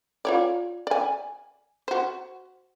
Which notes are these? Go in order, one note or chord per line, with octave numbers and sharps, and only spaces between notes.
F4 C#5 D5
D5 G#5
F#4 C5